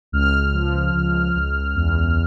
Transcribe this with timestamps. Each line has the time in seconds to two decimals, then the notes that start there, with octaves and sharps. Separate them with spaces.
0.12 C#2 F6
0.53 F3
0.94 C#2
1.35 C#2
1.75 E2